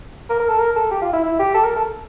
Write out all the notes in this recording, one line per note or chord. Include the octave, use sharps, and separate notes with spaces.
A#4
A#4
A4
A#4
A4
G4
F4
E4
E4
G4
A4
A#4
A4